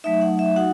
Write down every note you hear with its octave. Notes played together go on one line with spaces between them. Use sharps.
F#3 A3 D#4 E5
F#5
E5
D#4 F#4 F#5